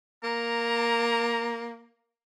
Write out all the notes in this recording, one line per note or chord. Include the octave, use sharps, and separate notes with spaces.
A#3 A#5